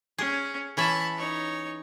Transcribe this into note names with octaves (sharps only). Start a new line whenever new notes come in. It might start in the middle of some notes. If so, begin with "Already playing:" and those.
C#4 G#4
E3 C#4 E5 A5 B5
D#4 C#5